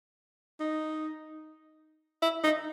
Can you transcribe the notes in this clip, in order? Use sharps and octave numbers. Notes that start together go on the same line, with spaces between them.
D#4
E4
D#4